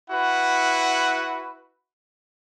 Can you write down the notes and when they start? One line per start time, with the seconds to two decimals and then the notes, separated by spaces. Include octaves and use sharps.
0.10 E4 F#4 B4 F#5